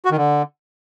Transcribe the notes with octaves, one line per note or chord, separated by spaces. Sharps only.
F#4
D#3
D3